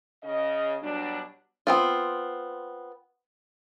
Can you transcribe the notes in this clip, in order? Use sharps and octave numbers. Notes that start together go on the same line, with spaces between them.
C#3 D#5
B2 F#3 G3 D4
B3 C4 F4